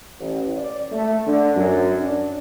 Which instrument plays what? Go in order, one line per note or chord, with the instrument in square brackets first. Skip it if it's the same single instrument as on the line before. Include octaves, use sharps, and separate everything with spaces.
[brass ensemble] A1
D5
A3
D3
F#2
D4